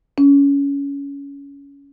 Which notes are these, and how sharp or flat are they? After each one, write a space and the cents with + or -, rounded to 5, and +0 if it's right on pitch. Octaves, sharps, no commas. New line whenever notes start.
C#4 +20